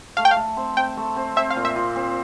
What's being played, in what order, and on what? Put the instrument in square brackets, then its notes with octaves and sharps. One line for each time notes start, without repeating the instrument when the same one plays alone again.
[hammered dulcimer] A3 [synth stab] F5
[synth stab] G5
F5
[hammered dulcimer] A3
C4
[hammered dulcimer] C4 [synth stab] G5
[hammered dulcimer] A3
C4
[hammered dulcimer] C4 [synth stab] E5
[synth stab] F5
[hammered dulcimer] A#2
[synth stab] E5
[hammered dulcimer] A#2
C4